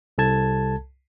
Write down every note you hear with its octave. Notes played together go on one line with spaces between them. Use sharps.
C2 A4 A5 G#6